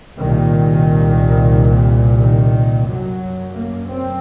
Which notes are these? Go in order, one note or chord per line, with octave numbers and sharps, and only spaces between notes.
C2 A#2 D#3
D#3
F#2 F#3
A#3
C4